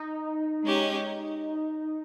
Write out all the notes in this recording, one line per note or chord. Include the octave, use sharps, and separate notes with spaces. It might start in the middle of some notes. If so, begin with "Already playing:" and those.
Already playing: D#4
G#3 C#4 G4